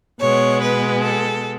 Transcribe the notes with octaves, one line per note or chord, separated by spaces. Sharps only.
B2 G#3 B3 C#5
B4
A4